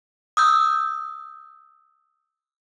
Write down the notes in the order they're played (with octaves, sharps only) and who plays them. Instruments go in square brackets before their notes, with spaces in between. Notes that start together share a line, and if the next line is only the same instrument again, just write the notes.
[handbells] D#6 E6 G6